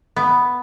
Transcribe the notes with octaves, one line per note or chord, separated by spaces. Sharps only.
B3